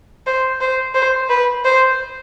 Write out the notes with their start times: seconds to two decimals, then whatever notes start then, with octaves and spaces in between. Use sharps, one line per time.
0.27 C5
0.61 C5
0.95 C5
1.30 B4
1.65 C5